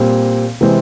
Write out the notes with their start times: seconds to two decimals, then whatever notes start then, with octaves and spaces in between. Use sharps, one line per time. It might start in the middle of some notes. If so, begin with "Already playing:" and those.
Already playing: A#2 G3 C4
0.61 C3 E3 G#3 C4